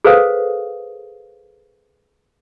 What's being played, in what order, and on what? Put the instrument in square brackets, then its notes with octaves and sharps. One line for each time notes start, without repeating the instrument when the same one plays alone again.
[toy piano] G#4 A4 B4 C5 F5 D#6